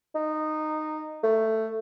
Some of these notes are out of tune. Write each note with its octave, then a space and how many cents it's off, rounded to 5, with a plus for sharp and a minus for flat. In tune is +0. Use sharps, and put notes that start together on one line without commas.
D#4 -15
A3 +10